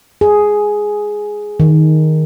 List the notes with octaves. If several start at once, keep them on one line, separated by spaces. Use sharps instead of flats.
G#4
D#3